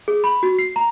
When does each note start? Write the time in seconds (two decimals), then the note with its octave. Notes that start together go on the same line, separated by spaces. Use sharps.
0.08 G#4
0.24 B5
0.43 F#4
0.59 C7
0.76 A#5